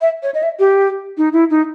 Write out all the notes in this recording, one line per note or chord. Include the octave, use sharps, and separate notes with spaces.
E5
C#5
D#5
E5
G4
D#4
E4
D#4